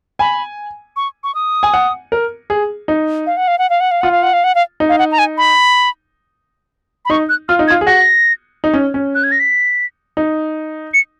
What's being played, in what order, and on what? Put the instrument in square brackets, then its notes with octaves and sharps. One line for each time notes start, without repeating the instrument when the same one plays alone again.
[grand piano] G#5 [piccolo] B5
[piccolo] C#6
C#6
D#6
[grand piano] G#5
F#5
A#4
G#4
D#4
[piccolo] F5
F#5
F5
F#5
F5
F#5
F5
[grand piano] F4 [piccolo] F#5
[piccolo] F5
F#5
F5
F#5
F5
[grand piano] D#4
[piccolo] F5
F#5
A#5
G#5
B5
B5
[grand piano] D#4 [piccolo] C#6
[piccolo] F#6
[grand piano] F4 [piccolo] F6
[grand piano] D#4
[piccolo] G#6
[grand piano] F4
G#4
[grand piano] F#4 [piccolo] A#6
[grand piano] D#4
C#4
C#4
[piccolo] F#6
G#6
A#6
B6
[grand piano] D#4
[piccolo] C#7